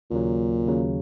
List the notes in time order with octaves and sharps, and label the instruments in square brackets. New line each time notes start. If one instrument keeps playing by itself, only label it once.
[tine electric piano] D#2 C#3 F#3 [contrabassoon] A#2
[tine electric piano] D#2 C#3 F#3